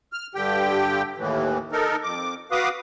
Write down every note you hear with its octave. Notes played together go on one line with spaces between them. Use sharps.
F6
G2 D3 G4 G5
D#2 A2 E3
D#4 A4 A#4
F2 D6
F#4 B4 F5 D6 D#6